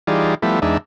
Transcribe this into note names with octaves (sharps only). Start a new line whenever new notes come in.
E3 G3 D#4 F4 G#4 D5
F3 G3 A3 B3 E4
E2 G#3 D4 D#4 E5